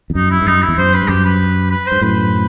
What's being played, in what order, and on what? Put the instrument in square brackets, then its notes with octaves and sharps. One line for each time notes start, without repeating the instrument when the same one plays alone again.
[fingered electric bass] E2
[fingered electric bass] F#2 [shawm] D#4
[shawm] E4
[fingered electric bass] G2
[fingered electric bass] F#2 [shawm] D#4
[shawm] E4
[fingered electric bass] E2
[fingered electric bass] F#2 [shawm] C5
[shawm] B4
[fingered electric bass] G2
[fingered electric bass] F#2 [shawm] G4
[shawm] B4
B4
[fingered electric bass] G2 [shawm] C5
[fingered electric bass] F#2 A2 [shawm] B4